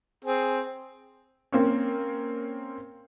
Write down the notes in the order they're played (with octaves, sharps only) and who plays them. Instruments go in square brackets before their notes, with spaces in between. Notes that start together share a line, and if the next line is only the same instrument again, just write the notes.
[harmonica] C4 G#4
[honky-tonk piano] A#3 C4 C#4